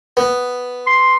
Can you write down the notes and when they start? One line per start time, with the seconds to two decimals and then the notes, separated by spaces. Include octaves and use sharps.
0.17 B3
0.87 C6